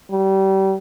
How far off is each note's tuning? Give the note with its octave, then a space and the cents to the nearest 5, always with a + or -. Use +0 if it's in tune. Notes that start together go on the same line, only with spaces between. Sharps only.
G3 -30